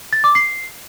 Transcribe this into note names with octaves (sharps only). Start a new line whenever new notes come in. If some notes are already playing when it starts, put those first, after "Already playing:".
A6
D6
C7